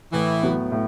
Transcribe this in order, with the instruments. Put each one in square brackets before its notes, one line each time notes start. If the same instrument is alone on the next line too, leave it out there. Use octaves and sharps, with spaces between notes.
[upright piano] A2 [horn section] E3
[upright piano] F#3 B3
A2